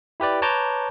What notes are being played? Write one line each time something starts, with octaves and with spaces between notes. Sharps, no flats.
E4 G4 B4 D5
B4 C#5 A5 A#5 D6 G6